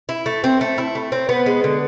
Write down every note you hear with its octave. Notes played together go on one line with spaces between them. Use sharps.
E4
A3
C4
A3
E4
A3
C4
B3
G#3
D3